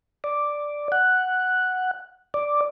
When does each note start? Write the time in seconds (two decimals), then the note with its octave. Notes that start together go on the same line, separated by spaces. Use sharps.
0.24 D5
0.92 F#5
2.34 D5